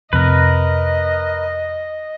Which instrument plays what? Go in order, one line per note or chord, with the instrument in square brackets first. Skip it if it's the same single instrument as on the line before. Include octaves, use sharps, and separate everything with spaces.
[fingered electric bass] F2 C3 [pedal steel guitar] A#4 B4 [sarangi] D#5